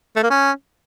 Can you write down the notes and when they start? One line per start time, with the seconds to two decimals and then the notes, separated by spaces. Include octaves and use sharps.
0.16 A3
0.23 A#3
0.30 C#4